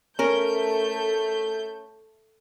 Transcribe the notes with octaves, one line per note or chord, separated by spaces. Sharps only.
A3 C#4 A#4 G6